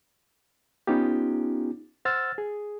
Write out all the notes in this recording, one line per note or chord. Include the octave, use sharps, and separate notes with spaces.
B3 C#4 D#4 F4 G4
C5 F#5 E6 F6 A6
G#4